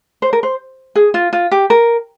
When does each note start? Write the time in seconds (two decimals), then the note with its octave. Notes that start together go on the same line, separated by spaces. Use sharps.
0.22 C5
0.33 A#4
0.43 C5
0.96 G#4
1.14 F4
1.33 F4
1.51 G4
1.70 A#4